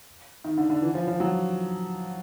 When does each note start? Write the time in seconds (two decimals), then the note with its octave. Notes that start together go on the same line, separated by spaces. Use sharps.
0.44 D#3
0.57 D3
0.70 D3
0.82 E3
0.94 F3
1.08 F3
1.20 F#3